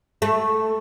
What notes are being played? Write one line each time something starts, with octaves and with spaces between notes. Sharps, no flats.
A3